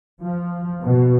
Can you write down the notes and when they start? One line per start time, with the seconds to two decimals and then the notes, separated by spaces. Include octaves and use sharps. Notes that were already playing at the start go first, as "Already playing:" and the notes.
0.22 F3
0.81 B2